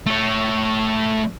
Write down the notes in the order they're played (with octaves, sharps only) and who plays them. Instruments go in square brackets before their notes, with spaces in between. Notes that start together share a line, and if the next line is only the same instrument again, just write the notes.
[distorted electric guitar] A3 C#5